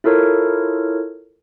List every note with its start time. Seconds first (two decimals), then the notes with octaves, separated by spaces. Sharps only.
0.04 E4 F4 A4 A#4 C#5